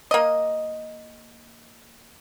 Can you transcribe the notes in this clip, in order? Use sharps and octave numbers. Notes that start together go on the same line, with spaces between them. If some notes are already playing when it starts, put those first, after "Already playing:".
A#3 D#5